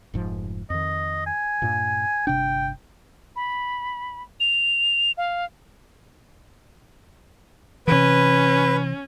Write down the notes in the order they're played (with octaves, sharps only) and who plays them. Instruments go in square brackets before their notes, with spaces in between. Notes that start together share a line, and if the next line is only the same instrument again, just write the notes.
[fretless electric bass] F1 G#2 F3
[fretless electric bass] F2 D#3 [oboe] D#5
[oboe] G#5
[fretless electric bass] G2 A#2
[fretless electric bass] G1 C3 D4 [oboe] G5
[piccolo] B5
F7
F5
[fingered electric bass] C3 E3 [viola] C#4 [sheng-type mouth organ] B4